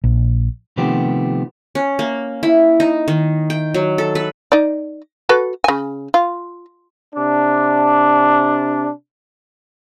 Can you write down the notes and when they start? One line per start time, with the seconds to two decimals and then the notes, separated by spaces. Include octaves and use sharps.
0.04 A#1
0.77 C3 D#3 F3 A3 B3 G4
1.75 C#4
1.99 A#3
2.43 E4
2.80 D#4
3.08 D#3
3.50 G5
3.74 F#3
3.98 A4
4.15 B4
4.52 D#4 D5
5.29 F#4 A4 B4
5.64 C#3 G#5
6.14 F4
7.15 C3 D4